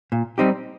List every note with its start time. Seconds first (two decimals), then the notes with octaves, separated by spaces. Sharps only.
0.12 A#2
0.38 G3 C4 D#4 G4